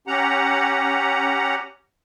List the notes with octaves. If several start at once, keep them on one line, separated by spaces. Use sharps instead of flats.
C#4 G4 F#5 A#5